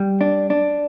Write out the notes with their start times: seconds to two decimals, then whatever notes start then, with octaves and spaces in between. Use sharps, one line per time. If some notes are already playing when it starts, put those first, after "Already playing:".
Already playing: G3
0.21 D4
0.50 D4